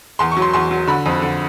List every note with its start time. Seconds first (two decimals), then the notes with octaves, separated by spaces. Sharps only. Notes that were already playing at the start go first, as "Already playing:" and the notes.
0.19 E2 C6
0.31 C#6
0.37 F#3
0.42 C6
0.53 E2 C6
0.71 F#3
0.87 D3 B5
1.06 F2
1.22 D3